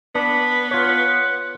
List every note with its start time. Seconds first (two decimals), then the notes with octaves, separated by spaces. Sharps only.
0.15 B3 D4 B5
0.71 F4 C#5 F#5